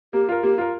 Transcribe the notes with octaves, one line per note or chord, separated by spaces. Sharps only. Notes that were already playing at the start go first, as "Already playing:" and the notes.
A#3 G4
F4 A#4
A#3 G4
F4 A#4